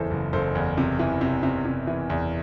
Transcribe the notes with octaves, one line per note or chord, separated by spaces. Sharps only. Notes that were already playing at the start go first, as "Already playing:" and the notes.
Already playing: F#1 E2 E3 A4 C5
F#1
F#1 A4 C5
E2
C3
E3
C3
C3
C3
E3
E2